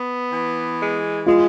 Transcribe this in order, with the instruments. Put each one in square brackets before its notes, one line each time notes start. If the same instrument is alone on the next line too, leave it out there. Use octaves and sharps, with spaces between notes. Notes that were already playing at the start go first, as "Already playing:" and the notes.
Already playing: [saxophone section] B3
E3
G#3
[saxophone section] G#3 [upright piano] F4